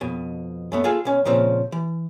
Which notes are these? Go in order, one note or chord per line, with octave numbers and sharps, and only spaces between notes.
F2 B2
F#2 A3 B3
F4 G#4 A4 F5
B1 C#4
A#2 C#3 F3 C4
E3